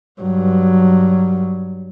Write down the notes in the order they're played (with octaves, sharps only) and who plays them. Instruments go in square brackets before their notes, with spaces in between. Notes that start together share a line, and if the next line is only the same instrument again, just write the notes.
[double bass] G2 F#3